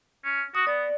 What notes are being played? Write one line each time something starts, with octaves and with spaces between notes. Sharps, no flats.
C#4
F#4 D#6
B3 D5